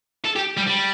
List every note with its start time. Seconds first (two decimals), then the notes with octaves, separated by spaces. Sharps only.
0.25 A4
0.36 G4
0.57 G3
0.67 G3